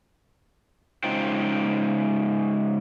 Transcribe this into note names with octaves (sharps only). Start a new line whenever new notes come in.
C#3 G#3 D#4 F4 C5 G5